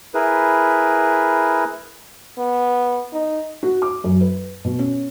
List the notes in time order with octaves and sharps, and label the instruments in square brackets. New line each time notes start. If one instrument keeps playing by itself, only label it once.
[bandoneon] E4 G#4 A#4 B4
[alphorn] B3
D#4
[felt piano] F#4
D6
F#2
B4
B2
C#4